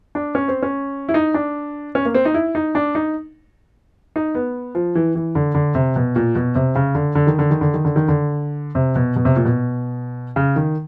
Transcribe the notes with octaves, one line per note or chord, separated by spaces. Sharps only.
D4
C#4
C4
C#4
E4
D#4
D4
C#4
A#3
C4
D#4
E4
D#4
D4
D#4
D#4
B3
F3
E3
E3
D3
D3
C3
B2
A#2
B2
C3
C#3
D3
D3
D#3
D3
D#3
D3
D#3
D3
D#3
D3
C3
B2
B2
C3
A#2
B2
C#3
D#3